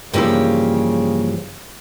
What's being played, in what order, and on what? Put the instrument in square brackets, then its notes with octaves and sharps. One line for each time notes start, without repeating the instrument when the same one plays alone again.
[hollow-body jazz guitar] G2 E3 F3 [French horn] C#3 [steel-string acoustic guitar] A#3 G4